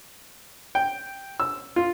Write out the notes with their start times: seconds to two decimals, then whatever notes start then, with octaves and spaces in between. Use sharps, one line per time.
0.75 G5
1.40 E6
1.76 F4